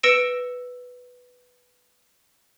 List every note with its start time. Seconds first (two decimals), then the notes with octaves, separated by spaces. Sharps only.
0.03 B4 E6 A#6 C#7 D7 E7